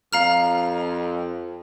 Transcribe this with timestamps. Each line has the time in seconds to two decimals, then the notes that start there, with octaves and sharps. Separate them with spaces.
0.13 F2 F5 A#5 F6